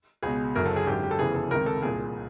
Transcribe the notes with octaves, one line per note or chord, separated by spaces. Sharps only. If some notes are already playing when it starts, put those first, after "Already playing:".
C#2 B2 G#4
F#1 F#2 D3 A#4
A4
G#4
G#1 F#2 D3 G4
G4
A4
F1 E2 C#3 E3 G#4
A4
C#2 C3 D#3 A#4
A4
C2 A#2 G#4